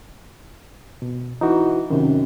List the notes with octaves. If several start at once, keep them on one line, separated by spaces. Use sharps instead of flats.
B2
E3 D#4 F#4
F#2 C3 D#3